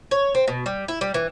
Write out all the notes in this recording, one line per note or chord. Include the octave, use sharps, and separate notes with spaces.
C#5
C4
B2
G3
E4
G3
E3